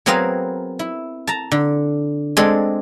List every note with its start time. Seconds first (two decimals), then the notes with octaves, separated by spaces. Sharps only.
0.06 F#3 B3 C4 G#4 A#4 F5
0.79 E4
1.27 A5 A#5
1.52 D3
2.37 G#3 C4 D4 G#4 A4